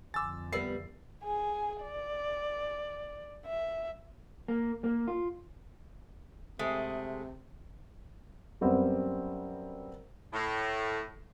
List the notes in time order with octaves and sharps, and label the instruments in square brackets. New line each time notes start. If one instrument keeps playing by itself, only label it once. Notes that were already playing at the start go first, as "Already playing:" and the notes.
[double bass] F2 D3 [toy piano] G#5 C6 D6 [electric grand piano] E6 A6
[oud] G3 B3 [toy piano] A#4 E5 [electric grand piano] C7
[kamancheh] G#4 G#5
D5
E5
[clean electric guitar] A#3
A#3
F4
[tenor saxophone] C3 [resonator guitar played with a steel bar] G#3 A3 G#4
[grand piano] F#2 G3 B3 C4
[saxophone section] A2